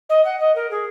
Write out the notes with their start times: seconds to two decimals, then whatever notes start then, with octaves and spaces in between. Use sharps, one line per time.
0.09 D#5
0.24 F#5
0.40 D#5
0.55 A#4
0.71 G#4